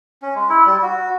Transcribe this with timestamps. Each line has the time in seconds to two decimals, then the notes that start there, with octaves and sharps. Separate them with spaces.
0.22 C#4
0.35 G#3
0.49 E4
0.66 G3
0.83 F#4